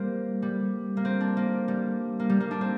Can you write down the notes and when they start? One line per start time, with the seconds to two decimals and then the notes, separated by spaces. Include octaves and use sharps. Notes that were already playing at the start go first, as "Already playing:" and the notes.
Already playing: G3 A#3 C4
0.42 G3
0.97 A#3
1.05 C4
1.21 D4
1.37 A#3
1.68 G3
2.19 A#3
2.29 G3
2.40 A#3
2.51 D4
2.61 C4